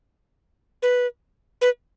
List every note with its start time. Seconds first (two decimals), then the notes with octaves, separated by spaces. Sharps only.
0.82 B4
1.61 B4